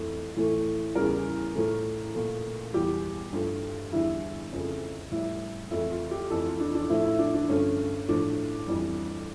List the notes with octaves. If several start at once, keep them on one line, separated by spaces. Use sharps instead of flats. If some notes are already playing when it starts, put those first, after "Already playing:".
Already playing: F2 E3 A3
A2 E3 A3
E2 C#3 G3 A#4
A2 F3 A3
A#2 A3
E2 E3 G3 G4
G2 F3 A3 F4
E2 D3 G3 E4
F2 C#3 F3 A3
A2 G3 E4
F2 E3 A3 E4
F4
G4
F2 E3 A3 A4
F4
D4
D4
A2 F3 A3 E4
E4
D4
D4
G2 D3 F3 A3 C#4
A2 F3 A3 D4
F2 E3 G3